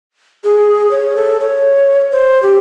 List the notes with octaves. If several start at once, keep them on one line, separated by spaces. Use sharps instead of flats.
G#4
C#5
A4
C#5
C5
G4